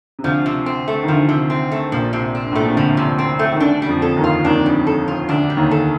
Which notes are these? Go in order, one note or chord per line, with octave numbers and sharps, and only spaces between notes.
C3
D2 D3 F3
C3
C4
A3
D#3
D2 D3 F3
C3
C4
A3
A#1 A#2 F3
C3
C4
G2
A2
A#2 A3
C3
D2 D3 F3
C3
C4
A3
D#3
D2 D3 D4
G3
F2 F3
A4
D#2 D#3
F4
D#2 D#3 D4
G3
A4
F4
D2 D3 D4
G3
D#2 D#3
A4